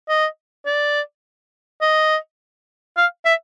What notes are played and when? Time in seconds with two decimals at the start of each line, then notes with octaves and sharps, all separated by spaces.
0.09 D#5
0.66 D5
1.81 D#5
2.97 F5
3.25 E5